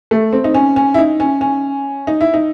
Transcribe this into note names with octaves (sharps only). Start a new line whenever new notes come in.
A3
C4
D#4
C#4
C#4
E4
D#4
C#4
C#4
D#4
E4
D#4